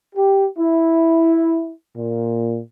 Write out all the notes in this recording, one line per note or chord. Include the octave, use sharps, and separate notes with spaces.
G4
E4
A#2